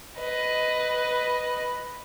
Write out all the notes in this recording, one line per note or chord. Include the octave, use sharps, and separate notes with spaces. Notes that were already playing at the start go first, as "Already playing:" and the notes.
B4 D#5